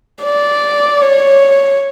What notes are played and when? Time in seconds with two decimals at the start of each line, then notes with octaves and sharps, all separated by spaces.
0.24 D5
1.02 C#5